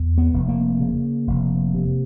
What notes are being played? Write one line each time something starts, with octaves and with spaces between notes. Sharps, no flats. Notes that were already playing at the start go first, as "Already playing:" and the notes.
Already playing: E2
B3
F1
A#3
C#3
F1
C3